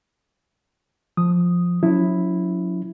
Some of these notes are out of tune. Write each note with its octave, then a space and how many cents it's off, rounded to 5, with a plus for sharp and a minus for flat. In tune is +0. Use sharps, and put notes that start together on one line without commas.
F3 +5 D#6 +0
F#3 -40 C#4 +35 E4 +0